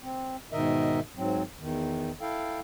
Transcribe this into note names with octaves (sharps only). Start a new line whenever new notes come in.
C4
G#2 B2 D#3 A#4 D#5 E5
G#2 F#3 C4
E2 D#3
E4 A4 F5 G5